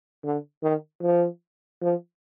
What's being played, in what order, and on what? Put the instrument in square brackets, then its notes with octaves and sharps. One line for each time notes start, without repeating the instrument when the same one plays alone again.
[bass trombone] D3
D#3
F3
F3